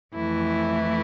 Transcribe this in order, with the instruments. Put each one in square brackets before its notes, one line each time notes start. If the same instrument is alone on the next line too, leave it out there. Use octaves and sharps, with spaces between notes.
[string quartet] F2 E3 A3 E4